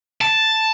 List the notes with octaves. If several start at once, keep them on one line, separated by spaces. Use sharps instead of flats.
A5